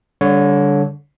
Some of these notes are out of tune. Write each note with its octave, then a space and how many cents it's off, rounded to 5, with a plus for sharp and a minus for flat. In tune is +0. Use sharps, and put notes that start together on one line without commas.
D3 -25 G3 +5 C#5 +0